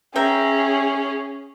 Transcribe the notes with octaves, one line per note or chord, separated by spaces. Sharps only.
C#4 G#4 E5 G5 A#5